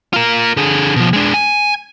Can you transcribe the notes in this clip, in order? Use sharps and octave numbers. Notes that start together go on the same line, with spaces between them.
F4 A#4
D3 G#4
B2 F3
G#3 D4
G#5